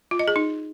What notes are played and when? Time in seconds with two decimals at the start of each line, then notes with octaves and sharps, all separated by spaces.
0.11 F4
0.19 D#5
0.28 G#4
0.36 D#4